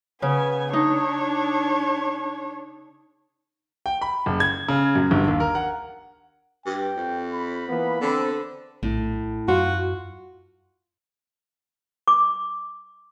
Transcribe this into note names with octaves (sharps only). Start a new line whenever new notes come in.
C#3 B3 G#5
D4 D#4 C#5
G5
B5
F#1
G#6
C#3
F#2
G1
D#2
A#4
F#5
G2 G5
F2
B5
E3 A#3 B3
D3 C4
A#1 A2
F#2 F4 F#4
D6